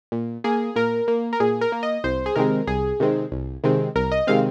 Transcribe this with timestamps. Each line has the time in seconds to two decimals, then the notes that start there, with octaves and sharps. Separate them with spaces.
0.12 A#2
0.44 A#3 G#4
0.76 A#2 A#4
1.08 A#3
1.33 A#4
1.40 A#2 G#4
1.61 A#4
1.72 A#3
1.83 D#5
2.04 C2 C5
2.26 G#4
2.36 C3 D#3 G#3 C4 A#4
2.67 C2 G#4
3.00 C3 D#3 G#3 C4
3.32 C2
3.64 C3 D#3 G#3 C4
3.96 C2 A#4
4.12 D#5
4.27 C3 D#3 G#3 C4 F5